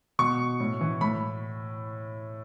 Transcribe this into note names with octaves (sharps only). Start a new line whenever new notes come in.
B2 C#6
A2
E3
A2 B5